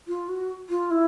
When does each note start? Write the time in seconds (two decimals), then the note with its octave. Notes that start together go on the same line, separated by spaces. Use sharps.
0.08 F4
0.29 F#4
0.69 F4
0.91 E4